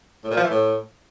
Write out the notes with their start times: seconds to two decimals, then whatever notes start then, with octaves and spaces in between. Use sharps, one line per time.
0.24 A2
0.31 A#2
0.37 F3
0.44 E3
0.50 A2